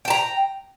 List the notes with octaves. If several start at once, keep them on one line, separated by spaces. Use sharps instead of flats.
G5 A5 A#5